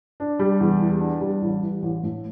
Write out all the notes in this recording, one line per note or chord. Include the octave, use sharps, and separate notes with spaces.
D4
G3
E2
E3
D4
G3
A1
E3
A1
A2